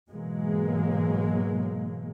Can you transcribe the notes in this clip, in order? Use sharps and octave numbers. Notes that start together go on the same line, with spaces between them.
G#2 B2 E3 F#3 G#3 A#3